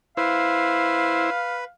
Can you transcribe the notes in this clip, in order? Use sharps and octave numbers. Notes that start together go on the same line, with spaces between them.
E4 B4 C5 F5